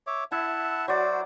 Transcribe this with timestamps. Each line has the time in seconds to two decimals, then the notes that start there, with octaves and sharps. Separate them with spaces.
0.07 C#5 E5 D6
0.32 E4 E5 F#5 A5
0.88 F#3 F#4 C5 D5